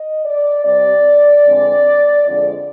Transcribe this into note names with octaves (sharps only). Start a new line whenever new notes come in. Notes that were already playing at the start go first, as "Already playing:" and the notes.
Already playing: D#5
D5
C3 G3 C4 D5
F2 D3 G#3 C4
F2 D3 G#3 C4 D5